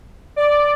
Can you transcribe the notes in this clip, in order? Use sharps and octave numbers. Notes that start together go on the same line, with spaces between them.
D5